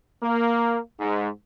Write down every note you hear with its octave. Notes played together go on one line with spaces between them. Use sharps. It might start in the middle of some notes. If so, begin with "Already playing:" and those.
A#3
G#2